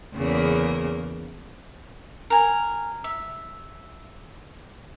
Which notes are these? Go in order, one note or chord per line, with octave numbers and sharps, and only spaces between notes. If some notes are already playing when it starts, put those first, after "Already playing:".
E2 C#3 A#3
A#4 G#5
E5